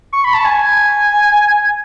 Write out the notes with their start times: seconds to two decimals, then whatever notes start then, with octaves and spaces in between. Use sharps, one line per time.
0.13 C#6
0.25 B5
0.34 A5
0.45 G#5